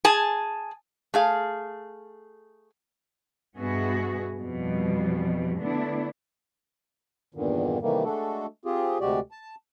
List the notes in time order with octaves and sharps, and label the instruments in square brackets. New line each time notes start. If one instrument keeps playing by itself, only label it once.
[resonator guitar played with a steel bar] G#4 G#5 A5
A3 G#4 F5
[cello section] G2 B2 B3 F#4 G#4 E5
F2 B2 E3 F3 G3
D3 A3 B3 D4 E4
[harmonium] E2 G2 A#2 D3 D#3
C3 D#3 E3 G3 A3 A#3
G#3 A3 D4 F#4 A4
C4 F4 G4 G#4
D2 C3 G#3 F#4 G4 D5
A5